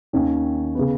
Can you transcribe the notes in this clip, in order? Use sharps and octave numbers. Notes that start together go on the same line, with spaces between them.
D#2 D#3 C#4
C#3 B3